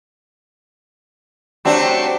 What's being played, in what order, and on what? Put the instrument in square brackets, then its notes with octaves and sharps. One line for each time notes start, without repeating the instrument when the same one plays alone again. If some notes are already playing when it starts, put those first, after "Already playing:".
[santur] F#3 G3 E5 [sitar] A3 C4 D4